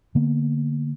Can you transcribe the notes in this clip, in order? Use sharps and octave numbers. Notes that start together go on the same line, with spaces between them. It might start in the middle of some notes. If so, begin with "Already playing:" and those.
D3 A#3 B3